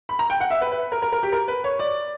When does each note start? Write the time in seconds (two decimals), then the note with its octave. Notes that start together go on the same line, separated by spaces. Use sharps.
0.09 B5
0.19 A#5
0.30 G5
0.40 F#5
0.51 E5
0.61 B4
0.72 B4
0.92 A#4
1.02 A#4
1.12 A#4
1.23 G4
1.32 A#4
1.48 B4
1.64 C#5
1.79 D5